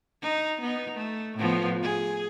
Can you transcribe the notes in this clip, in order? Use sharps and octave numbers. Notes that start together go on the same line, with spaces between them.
D#4
B3 D#4
A3
A2 F3 B3
G#4